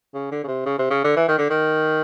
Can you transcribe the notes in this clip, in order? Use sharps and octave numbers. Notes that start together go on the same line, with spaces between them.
C#3
D3
C#3
C3
C#3
C3
C#3
D3
E3
D#3
D3
D#3